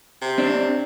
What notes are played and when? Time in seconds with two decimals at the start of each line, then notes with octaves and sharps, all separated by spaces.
0.21 C3
0.38 C4 D4